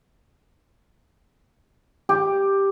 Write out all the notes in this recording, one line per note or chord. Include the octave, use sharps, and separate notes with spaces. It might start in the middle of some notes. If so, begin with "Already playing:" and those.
G4